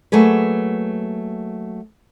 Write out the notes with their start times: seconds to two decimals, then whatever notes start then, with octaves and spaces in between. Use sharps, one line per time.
0.12 F#3 A3 A#3 G#4 B4